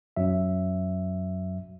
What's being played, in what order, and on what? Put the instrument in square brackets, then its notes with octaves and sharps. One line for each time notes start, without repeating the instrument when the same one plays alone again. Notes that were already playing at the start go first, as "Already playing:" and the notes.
[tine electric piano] F#2 F#3 E5